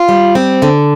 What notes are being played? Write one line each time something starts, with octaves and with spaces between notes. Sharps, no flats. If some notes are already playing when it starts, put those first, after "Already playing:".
Already playing: F4
G3
C4
D3